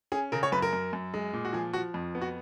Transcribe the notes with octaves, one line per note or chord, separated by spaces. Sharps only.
C#4 G#4
C#3 A#4
C#5
F#2 B4
A#4
F#2
F#2
G#3
A#2
F#4
F3 G#4
F3 F#4
F2
B3
F#4